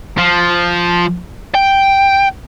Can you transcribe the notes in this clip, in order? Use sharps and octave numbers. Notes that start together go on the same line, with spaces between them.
F3
G5